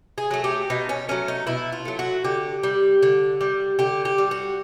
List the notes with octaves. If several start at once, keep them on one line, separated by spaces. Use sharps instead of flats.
G#4
F#3 A3
G4
B2 D#4
C#4
F#3 A3 C#4
D#4
B2 E4
F4
F#3 A3
F#4
D3 G4
G3
D3
G3
D3 G4
G4
G3
F#4